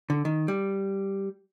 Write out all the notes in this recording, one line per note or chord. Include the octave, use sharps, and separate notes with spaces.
D3
D#3
G3